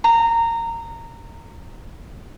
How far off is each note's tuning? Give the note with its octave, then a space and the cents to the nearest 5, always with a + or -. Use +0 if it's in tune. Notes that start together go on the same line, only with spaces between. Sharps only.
A#5 -20